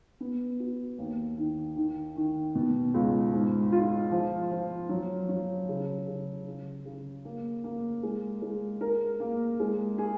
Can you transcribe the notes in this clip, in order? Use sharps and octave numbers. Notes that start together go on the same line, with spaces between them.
B3
F#4
D#2
D#3
D#3
D#3
B2
C#2
G#2
F4
F3
F3
F#3
F#3
C#3
C#3
C#3
C#3
A#3
A#3
G#3
G#3
A#4
A#3
G#3
G#4